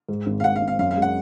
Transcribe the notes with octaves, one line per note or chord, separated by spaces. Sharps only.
G#2
G#1
F5
G#2 F#5
F5
G#1
F5
F#2 F5
F5
G#3
F#5